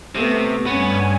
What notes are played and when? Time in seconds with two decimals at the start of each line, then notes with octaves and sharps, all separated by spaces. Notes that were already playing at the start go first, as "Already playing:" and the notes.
0.15 C3 A3 B3
0.66 G2 B3 C#4 G#5